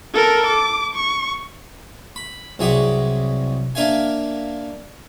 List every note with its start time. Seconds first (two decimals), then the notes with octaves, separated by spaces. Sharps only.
0.14 A4 A#4
0.47 D6
0.96 C#6
2.16 B5
2.59 C2 F#3 G#4 E5 F#5 D6
3.75 A#3 D4 A#4 E5 F5 G#5